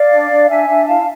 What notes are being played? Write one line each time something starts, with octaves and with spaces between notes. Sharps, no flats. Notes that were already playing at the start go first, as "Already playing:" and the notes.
Already playing: D5 F5
D4
D4
D4 E5 G#5
D4
E4 F5 A5